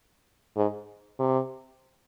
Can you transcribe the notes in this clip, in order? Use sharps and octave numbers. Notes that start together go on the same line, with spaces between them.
G#2
C3